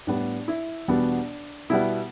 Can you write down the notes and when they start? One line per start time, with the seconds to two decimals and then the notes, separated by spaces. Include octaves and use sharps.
0.07 A2 G3 B3 D4
0.48 E4
0.88 E2 B2 G3 B3 D4
1.70 B2 G3 B3 E4